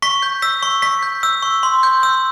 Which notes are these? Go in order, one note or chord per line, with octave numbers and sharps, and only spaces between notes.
C#6 B6
G6
E6 B6
C#6
C#6 B6
G6
E6
C#6
C6
G6
E6